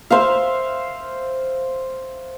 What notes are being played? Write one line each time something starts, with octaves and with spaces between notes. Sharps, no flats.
C5 E5 F5